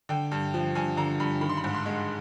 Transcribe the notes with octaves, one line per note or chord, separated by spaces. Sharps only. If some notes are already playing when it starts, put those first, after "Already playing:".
D3 G5
G2
F3
G2 G#5
D3 A#5
G2 B5
D#3 B5
C6
B5
G#2
C6
G#3